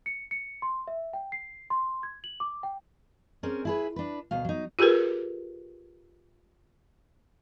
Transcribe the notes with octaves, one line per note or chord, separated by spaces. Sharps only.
C#7
C#7
C6
E5
G5
C7
C6
G#6
F#7
D6
G5
C4 C#4 G#4 A#4
E4 G#4 B4
D4 B4
D2 B2 F5
F#3 D#4
F4 G4 G#4 A#4 B4